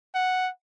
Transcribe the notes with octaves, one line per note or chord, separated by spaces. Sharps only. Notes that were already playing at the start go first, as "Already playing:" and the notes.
F#5